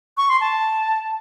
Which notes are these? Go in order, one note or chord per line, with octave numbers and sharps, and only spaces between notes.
C#6
C6
A5